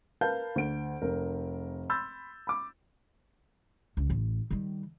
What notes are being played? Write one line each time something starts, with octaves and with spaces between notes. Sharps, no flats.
A#4 B4 F5 A5 G6
D2 D7
F1 A#4
B5 C6 E6 G6 A6
B5 D6
C#2
A1
D#3 G3